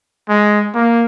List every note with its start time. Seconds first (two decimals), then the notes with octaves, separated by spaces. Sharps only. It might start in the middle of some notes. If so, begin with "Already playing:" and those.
0.29 G#3
0.74 A#3